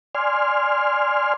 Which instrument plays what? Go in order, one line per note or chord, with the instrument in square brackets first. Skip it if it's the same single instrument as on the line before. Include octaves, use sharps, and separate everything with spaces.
[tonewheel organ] D5 G#5 C6 F6